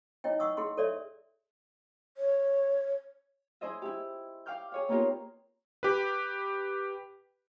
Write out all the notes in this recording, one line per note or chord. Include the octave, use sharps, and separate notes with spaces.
D#4 E4 C#5 D#5 G5
F#5 C#6 D#6 E6
E4 G#4 F#5 C6
A4 C#5 D5 E5
C#5
E4 G#4 C5 D#5 E5
E4 G4
F5 G5 D6 F6 G6
G#4 C#5 F5
A#3 B3 D#4 F4 G4 A#4
G4 B4